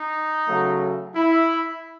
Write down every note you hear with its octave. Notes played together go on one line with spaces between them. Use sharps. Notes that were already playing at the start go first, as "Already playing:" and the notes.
Already playing: D#4
C#3 F#3 A3
E4